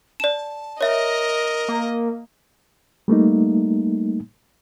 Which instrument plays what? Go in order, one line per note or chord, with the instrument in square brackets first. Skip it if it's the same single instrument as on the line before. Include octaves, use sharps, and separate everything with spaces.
[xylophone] D5 E7 [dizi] A5
[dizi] A#4 [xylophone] C#5 E5 [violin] D#5
[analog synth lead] A#3
[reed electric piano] G3 A3 A#3 D#4